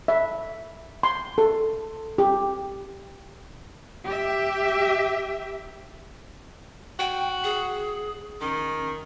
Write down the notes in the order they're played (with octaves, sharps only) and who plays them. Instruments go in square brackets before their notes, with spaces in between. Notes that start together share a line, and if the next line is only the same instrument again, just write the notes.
[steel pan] E5
C6
A4
G4
[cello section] G4 E5
[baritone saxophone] F#4 [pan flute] G5
[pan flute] G#4
[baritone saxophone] D#3 [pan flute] C#4